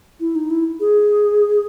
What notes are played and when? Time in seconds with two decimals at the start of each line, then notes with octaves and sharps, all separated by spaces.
0.20 E4
0.35 D#4
0.50 E4
0.80 G#4